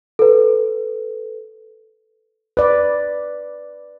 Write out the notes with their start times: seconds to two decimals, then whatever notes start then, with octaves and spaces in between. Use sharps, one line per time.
0.19 A4 B4
2.57 B4 D5